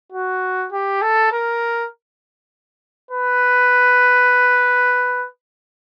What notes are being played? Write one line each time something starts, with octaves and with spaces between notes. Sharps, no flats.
F#4
G4
A4
A#4
B4